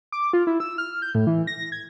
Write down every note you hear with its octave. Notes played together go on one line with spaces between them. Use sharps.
D6
F4
E4
E6
F6
G6
A2
E3
A#6
G#6